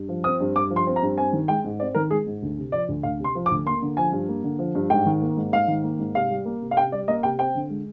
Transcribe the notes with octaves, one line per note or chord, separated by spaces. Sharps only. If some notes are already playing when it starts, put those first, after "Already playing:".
Already playing: G2
F3
C4 D#6
G2
G2 D6
F3
C6
C4
A#5
G2
C4 G#5
D#3
G#3 G5
G#2
C4 D5
D#3 A#4
G#3 G#4
G#2
D2
C3
F3 D5
D2
D2 F5
C3
C6
F3
D6
D2
A#3 C6
D3
F3 G#5
G2
A#3
D3
F3
G2
G#2 G5
D#3
A#3
G#2
G#2 F5
D#3
A#3
G#2
C3 F5
G3
A#3
C3
F5
C3 G5
G3 D5
A#3 D#5
C3 G5
C4 G5
D3
G#3